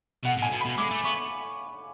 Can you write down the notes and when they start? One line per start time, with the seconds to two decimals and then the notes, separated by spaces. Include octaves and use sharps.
0.25 B2 F#5
0.38 A2 G#5
0.52 B2
0.61 B5
0.65 B2
0.78 G#3 D6
0.91 A3
1.04 B3 C#6